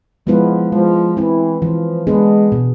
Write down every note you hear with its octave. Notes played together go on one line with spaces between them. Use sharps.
F3 G#3 B3 E4 B4
F3 G#3
E3 C4 E4
E3 F3
G#3 B3 D4 G#4 B4
B2